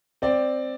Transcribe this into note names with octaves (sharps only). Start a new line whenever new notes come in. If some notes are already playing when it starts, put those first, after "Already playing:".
C4 D5